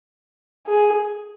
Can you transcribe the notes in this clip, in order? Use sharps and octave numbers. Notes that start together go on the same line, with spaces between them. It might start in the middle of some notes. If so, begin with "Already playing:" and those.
G#4